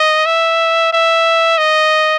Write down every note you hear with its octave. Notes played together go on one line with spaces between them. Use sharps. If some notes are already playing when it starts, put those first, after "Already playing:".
Already playing: D#5
E5
E5
D#5